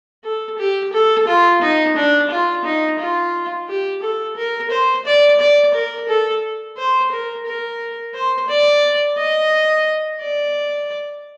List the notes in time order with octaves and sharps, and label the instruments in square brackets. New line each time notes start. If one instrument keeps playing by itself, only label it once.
[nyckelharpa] A4
G4
A4
F4
D#4
D4
F4
D#4
F4
G4
A4
A#4
C5
D5
D5
A#4
A4
C5
A#4
A#4
C5
D5
D#5
D5